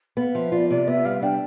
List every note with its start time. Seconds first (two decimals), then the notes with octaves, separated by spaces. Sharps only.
0.17 B3 F5
0.35 F3 E5
0.52 F4 D5
0.70 C3 D5
0.87 B3 E5
1.05 G3 F5
1.22 D4 G5